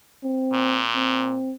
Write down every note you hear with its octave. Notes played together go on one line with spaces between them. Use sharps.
C4
A#2
C4